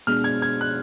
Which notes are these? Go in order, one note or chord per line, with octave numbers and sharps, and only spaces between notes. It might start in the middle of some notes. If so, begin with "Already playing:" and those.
B2 G#3 D4 F6
G#6
G#6
F#6